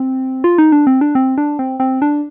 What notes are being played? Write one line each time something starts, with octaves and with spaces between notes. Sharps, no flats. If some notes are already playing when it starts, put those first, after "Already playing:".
Already playing: C4
F4
D#4
D4
C4
D4
C4
D4
C4
C4
D4